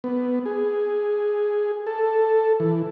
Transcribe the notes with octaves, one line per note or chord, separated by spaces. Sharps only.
B3
G#4
A4
E3